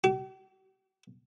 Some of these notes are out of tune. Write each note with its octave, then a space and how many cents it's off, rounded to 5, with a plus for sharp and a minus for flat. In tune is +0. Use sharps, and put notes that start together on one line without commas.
G4 -45